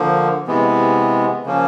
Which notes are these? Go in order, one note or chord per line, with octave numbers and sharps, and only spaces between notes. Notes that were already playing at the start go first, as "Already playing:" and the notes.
Already playing: D3 F3 A#3
C3 E3 G#3 B3
C#3 F3 A#3 C#4